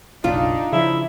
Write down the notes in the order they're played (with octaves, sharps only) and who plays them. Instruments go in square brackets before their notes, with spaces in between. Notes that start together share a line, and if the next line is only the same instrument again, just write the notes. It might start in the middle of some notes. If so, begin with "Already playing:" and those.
[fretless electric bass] F#1 B1 C#3 [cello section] D4 D#4 [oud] F4
[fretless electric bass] C#3 F3 [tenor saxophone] E4